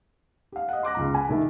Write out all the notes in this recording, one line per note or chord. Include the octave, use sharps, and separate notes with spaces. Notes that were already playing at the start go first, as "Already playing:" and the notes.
G4 F5
D#5 F#5
C6 D6 F#6 A#6
C#2 F3 A#5
G#5 A5 B5
A#1 D#3 E5